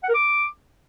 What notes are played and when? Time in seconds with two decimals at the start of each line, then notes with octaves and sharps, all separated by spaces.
0.03 F#5
0.09 A#4
0.14 D6